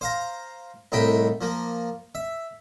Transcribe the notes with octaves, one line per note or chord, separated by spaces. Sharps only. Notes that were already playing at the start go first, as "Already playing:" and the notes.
C5 F5 A#5
C2 A2 D#4 G5 A5 B5
F3 A#3
E5